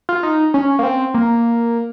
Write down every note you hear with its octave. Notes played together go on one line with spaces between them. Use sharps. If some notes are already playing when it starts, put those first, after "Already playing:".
F4
D#4
C#4
A#3
C4
A#3